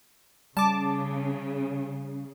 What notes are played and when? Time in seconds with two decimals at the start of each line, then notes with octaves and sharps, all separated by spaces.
0.57 C#3 G3 A5 D6